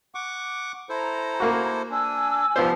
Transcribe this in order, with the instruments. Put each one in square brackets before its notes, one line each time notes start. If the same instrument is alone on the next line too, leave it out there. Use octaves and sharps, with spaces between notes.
[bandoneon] F#5 C#6 D6
[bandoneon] E4 A4 C5 [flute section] A#5
[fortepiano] A#3 F#4
[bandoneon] D4 [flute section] G#5 E6
[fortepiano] F3 B3 C5 [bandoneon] G3 F4 G4